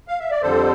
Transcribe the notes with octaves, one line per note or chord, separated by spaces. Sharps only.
F5
E5
D5
F2 D3 G3 A4 C5